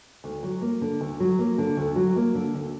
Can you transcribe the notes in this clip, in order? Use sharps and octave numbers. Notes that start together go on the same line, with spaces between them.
D2
F#3
A#3
D3
D2
F#3
A#3
D3
D2
F#3
A#3
D3
D2